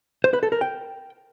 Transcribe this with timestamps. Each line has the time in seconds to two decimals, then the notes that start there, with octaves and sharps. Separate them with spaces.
0.24 C5
0.33 B4
0.43 A4
0.52 A#4
0.61 G5